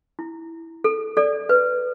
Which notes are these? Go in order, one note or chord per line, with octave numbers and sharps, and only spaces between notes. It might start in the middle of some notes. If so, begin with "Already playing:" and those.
E4
A4
A4 D5
B4